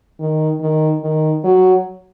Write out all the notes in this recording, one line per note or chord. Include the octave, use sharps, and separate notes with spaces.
D#3
D#3
D#3
F#3